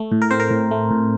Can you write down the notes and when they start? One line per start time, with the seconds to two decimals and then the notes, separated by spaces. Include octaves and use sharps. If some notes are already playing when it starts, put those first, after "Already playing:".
Already playing: A3
0.12 A2
0.22 A#4
0.31 C4 C5
0.40 A#4
0.51 A2
0.71 A3
0.91 A2